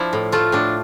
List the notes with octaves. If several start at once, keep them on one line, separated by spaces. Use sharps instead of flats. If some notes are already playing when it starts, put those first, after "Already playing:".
Already playing: F3 D4 E4
A2
A3 F4
A2 D4